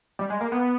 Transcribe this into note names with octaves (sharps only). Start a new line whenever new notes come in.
G3
G#3
A#3
B3